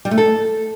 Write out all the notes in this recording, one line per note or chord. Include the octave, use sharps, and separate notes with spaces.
G3
A3
A4